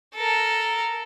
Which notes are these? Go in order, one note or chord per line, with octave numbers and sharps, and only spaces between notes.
A4 A#4